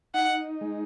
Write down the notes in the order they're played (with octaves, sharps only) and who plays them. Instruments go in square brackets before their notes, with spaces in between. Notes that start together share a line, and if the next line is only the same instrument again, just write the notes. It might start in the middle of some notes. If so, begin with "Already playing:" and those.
[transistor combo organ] D#4 [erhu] F#5
[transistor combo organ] G#3